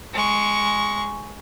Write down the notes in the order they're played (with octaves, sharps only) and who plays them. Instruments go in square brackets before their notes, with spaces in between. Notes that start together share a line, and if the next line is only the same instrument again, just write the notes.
[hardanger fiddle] G#3 C#6